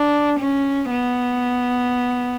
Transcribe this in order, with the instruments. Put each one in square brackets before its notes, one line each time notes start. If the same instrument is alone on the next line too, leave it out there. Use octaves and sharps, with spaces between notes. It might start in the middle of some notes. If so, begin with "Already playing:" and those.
Already playing: [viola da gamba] D4
C#4
B3